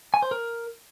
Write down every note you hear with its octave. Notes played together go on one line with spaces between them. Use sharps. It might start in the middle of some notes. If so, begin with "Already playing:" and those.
G#5
C5
A#4